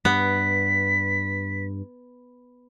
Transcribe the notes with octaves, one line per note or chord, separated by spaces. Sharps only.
G2 B3 B6